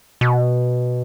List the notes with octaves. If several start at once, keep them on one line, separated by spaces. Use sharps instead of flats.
B2